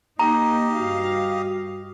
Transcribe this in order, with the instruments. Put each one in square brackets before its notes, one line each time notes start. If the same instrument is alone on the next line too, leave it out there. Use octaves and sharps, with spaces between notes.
[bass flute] A#3 [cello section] D#4 [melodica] G4 D#5 [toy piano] A#5
[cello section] G2 F5 [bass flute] F#4